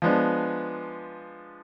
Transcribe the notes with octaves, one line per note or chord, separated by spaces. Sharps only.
F3 G#3 B3 D4